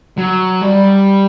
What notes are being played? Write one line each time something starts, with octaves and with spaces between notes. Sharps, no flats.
F#3
G3